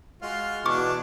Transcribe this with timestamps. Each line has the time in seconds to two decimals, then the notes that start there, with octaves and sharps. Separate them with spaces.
0.22 G#3 F4 F#4 F6
0.66 B2 E3 D4 A5 C#6 D6